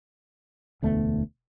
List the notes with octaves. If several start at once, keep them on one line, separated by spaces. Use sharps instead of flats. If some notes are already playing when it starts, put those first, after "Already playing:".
E1 D2 A3 B3